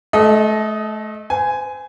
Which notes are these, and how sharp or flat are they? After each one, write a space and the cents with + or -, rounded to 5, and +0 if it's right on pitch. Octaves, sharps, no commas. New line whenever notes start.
A3 -30 A4 -25 D#5 +5
C5 -40 G#5 +0